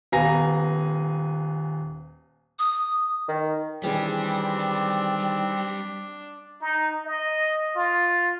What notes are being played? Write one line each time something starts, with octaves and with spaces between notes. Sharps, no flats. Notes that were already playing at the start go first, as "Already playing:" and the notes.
D#1 B3 F5 G#5 A#5 A#6
D#6
D#3
D#3 E3 G3 C4 D4 G#4
D#4
D#5
F4